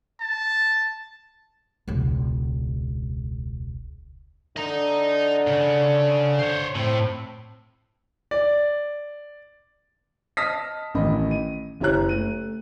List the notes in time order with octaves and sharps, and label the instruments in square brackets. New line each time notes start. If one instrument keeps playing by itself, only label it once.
[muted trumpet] A5
[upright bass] E1 C#2
[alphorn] D3 [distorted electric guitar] D#5 A#5
[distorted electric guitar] C#3
C5 C#5
[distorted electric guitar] A2 [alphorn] C4
[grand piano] D5
D#5 A5 D#6 F6 A#6 B6
A1 D#3 D#5 B5
D#7
F#1 E4 G4 C#5 A#5 F#6
A3 D#7